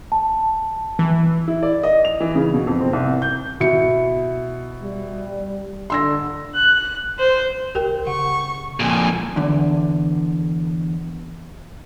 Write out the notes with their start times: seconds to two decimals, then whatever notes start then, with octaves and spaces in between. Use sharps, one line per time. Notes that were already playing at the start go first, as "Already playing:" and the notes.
0.12 A5
0.99 E3
1.48 E4
1.63 D5
1.83 D#5
2.05 F7
2.20 E3
2.35 C#3
2.54 B2
2.67 F2
2.80 C4
2.93 C2
3.22 G6
3.60 B2 E4 C#7
4.82 G3
5.90 D3 C6 E6 A#6
6.55 F#6
7.19 C5
7.75 C2 G4 A#4 G5
8.07 C#3 F#5 C#6
8.80 F2 A#2 G#5
9.36 E2 D3